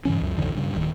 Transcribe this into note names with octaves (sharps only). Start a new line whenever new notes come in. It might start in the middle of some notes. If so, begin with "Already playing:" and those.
G2 C#3 E3 C#4
C#2 F#2
B1 F2 D3 D#3
G2 C#3
D1 D#3